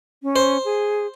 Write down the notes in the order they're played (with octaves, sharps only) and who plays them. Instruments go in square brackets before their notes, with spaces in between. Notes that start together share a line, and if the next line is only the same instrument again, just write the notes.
[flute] C#4
[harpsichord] C5
[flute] G#4